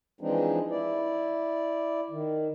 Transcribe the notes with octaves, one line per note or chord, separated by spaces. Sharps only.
E3 F3 G#3 C4 D4 D#4
E4 D5
D#3